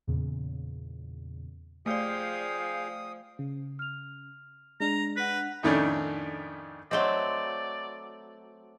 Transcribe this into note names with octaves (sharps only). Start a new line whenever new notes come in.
E2 A#2 C#3
F3 A3 G#4 D5 F5 G5 D#6
C#3
F6 F7
G#3 D4 A#5
B4 F#5 B6
F2 A2 D#3 A3 C#4 D4
F#3 A3 C4 D5 D#5 C6